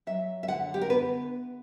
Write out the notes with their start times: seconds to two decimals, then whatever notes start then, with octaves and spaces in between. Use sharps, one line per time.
0.07 F#3 E5
0.43 E5
0.48 D3 F#5
0.74 G4
0.81 A#4
0.90 B3 B4